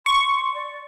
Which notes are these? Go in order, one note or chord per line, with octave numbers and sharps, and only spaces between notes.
C6 C#6
D5